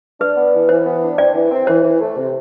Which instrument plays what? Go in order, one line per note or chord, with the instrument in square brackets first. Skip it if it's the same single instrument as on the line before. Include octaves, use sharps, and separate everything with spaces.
[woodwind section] D4 [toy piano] B4
[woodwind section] B3
E3
[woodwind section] E3 [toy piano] C5
[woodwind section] B3
D4
[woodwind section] C4 [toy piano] D5
[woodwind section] E3
C4
[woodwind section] E3 [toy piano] C5
[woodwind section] E3
A3
C3